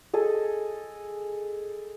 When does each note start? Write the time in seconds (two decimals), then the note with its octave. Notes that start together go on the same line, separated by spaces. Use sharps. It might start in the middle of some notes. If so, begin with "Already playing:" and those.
0.13 G#4 A4 D#5